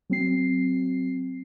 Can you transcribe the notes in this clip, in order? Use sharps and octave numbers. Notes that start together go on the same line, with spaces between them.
F#3 C4 C7